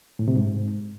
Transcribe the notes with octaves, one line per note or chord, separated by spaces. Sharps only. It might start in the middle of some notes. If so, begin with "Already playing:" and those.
A2
C3
G#2